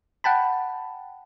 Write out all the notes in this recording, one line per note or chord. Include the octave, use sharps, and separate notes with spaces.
F#5 G5 A5 B5